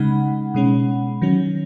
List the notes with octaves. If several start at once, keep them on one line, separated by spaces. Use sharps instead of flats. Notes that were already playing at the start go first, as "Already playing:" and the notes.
Already playing: C#3 G#3 D#4 F#5 B5
B2 G#3 C#4
D#3 F#3 C#4